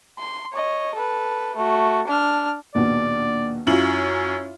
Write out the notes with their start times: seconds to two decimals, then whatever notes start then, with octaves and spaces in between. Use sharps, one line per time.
0.19 C6
0.53 C#5 D#5
0.94 A4 B4
1.56 A3 F#4
2.07 D4 F6
2.75 A#1 D#2 B2 D5
3.67 F#2 C#4 E4 F4 F#7